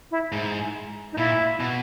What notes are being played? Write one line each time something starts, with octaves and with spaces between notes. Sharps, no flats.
E4
G#2
D#4
A#2 E4
B2